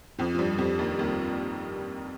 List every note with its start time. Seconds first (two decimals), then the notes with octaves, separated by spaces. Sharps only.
0.19 F2 F3
0.35 F3
0.39 G2 G3
0.58 F2 F3
0.79 D#2 D#3
0.99 D#2 D#3